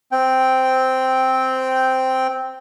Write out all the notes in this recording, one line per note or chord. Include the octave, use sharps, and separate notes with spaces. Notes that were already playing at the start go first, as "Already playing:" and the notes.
C4 G5